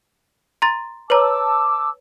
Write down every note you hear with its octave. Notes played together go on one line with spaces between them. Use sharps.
A#5 C6 A6
B4 C#5 A5 A#5 D6 E6